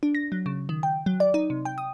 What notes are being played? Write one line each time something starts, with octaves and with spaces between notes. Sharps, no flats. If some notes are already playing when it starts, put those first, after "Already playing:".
D4
A#6
F#3
C#3
D#3
G5
F#3
D5
D#4
C3
G5
D#6